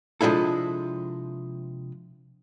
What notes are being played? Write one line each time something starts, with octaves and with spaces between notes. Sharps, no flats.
C3 F3 G#3 D4 E4 A4